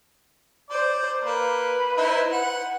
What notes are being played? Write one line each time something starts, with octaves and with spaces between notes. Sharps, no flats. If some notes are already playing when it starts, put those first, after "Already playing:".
C5 D5
A#3 B4
D#4 E4 C5
F#5